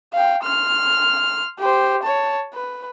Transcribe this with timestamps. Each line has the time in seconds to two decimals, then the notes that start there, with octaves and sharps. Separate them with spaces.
0.13 F5 G5
0.43 C6 F6
1.59 G4 C5
2.03 C#5 A5
2.53 B4